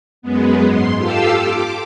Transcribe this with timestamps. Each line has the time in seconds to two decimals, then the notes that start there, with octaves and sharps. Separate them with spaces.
0.22 F#2 G#3 B3
0.65 G#2 C6
0.97 F4 G4 A4 F5 A5 E6
1.37 D6